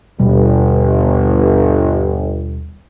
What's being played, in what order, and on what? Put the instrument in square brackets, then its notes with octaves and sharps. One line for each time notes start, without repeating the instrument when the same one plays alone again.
[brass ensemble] G1 [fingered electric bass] D#2 B2 G3